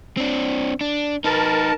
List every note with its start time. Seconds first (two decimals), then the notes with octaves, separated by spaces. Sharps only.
0.17 C4 D4
0.81 D4
1.24 D#4 A#4 B4 A5